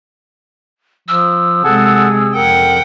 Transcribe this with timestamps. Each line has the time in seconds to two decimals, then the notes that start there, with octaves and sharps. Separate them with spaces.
1.08 F3 E6
1.64 C3 G#3 G#4 A4 F#5 A5
2.35 F2 A#4 F#5 G5